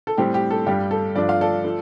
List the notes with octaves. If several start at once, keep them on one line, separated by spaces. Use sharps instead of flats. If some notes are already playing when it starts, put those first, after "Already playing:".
A4
A2 G3 C4 G4
G4
A4
G2 G3 D4 G4
A4
G2 F3 A3 D4 D5
F5
A4 D5
F3 A3